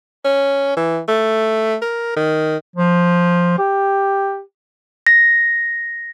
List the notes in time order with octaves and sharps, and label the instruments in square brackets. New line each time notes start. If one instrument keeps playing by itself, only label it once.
[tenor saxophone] C#4
E3
A3
A#4
D#3
[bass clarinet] F3
G4
[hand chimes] A#6